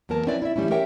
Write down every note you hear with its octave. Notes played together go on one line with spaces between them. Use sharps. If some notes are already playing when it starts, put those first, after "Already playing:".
E2 F#3 A#3 A#4 A5
F3 C4 C#4 E4 B4 D5
E4 D5 E5
E3 G3 A3 C#4 E4
C#4 G4 A#4 C#5 E5 G5